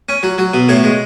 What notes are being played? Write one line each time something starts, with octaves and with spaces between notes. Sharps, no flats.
C#4
F#3
F#3
B2
A2 C#5
G#3